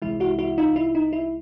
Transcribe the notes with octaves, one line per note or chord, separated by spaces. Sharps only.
C2 C3 E3 G#3 E4
E4 F#4
E4 F#4
D#4 F4
E4
D#4
E4